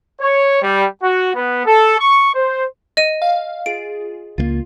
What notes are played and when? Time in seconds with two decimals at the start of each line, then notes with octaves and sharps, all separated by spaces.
0.21 C#5
0.62 G3
1.02 F#4
1.35 B3
1.66 A4
1.99 C#6
2.35 C5
2.97 D#5 D#7
3.22 F5
3.66 F4 G#4 D7
4.38 C#2 G#3 A#3 F4